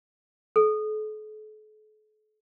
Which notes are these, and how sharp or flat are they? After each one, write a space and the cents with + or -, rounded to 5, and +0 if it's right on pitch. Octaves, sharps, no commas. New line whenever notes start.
A4 -40